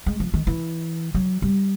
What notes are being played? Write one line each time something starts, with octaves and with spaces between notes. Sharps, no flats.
G#3
F3
D#3
E3
F#3
G3